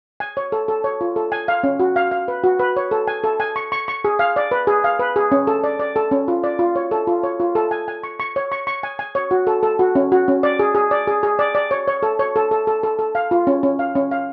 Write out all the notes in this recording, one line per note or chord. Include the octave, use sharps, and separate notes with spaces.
G#5
C#5
A4
A4
C#5
F4
A4
G#5
F5
C#4
F#4
F5
F5
B4
F#4
B4
C#5
A4
G#5
A4
G#5
C#6
C#6
C#6
G#4
F5
D5
B4
G#4
F5
B4
G#4
C#4
A4
D5
D5
A4
C#4
F4
D5
F4
C#5
A4
F4
C#5
F4
A4
G#5
G#5
C#6
C#6
C#5
C#6
C#6
G#5
G#5
C#5
F#4
A4
A4
F#4
C#4
F#4
C#4
D5
G#4
G#4
D5
G#4
G#4
D5
D5
C#5
C#5
A4
C#5
A4
A4
A4
A4
A4
F5
F4
C#4
C#4
F5
C#4
F5